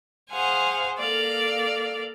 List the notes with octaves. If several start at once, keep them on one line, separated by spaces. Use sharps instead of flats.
G#4 C5 F5 F#5 G#5
A#3 A4 D5 F5